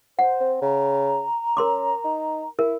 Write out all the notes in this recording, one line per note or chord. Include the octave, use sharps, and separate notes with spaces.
C5 F#5
C4
C#3 A#5
C#4 A#4 C6 D6
D#4
E4 A#4